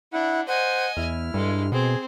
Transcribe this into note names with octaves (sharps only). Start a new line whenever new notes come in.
D4 E4 F#5
C5 D#5 F#5 G#5
E2 E4 F6
G2 G#3 A4
B2 C4 G#4